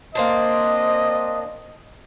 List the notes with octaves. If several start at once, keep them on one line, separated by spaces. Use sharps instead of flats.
A#3 C4 D4 D#5